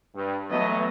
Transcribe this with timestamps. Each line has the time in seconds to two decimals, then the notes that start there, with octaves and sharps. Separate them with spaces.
0.15 G2
0.50 E3 F#3 A3 B3 D#5